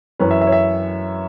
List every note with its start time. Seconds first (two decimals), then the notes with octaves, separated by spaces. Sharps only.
0.19 F#2 E3 C#4 B4
0.31 E5
0.41 E5
0.47 C#5
0.52 E5